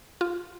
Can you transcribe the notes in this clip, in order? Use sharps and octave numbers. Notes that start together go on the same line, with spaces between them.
F4